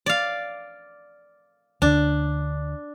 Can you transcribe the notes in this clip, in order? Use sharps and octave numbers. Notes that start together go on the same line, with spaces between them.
D5 F5
D2 D3 D4